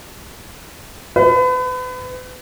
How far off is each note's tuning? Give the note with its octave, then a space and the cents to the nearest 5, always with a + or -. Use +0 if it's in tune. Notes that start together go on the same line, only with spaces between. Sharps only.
B4 +35